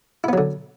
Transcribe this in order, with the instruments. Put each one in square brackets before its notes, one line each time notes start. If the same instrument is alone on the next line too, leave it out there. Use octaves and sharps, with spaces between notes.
[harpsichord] E4
B3
F#3
D3